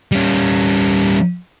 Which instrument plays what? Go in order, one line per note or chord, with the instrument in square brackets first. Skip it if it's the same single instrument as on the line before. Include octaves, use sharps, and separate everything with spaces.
[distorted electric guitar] G3 C#4